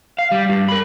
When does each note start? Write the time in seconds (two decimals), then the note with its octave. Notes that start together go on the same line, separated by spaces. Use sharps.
0.19 F5
0.31 G3
0.49 G2
0.69 A#4 B5